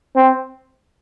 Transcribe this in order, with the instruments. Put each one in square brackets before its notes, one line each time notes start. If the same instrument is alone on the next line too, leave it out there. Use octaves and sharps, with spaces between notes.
[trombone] C4